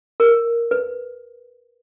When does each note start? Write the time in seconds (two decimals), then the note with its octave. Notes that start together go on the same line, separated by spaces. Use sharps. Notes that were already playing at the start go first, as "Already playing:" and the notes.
0.20 A#4
0.71 B4